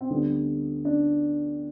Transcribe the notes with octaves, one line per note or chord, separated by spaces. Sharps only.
C4
D2 D3 G3 B3
D4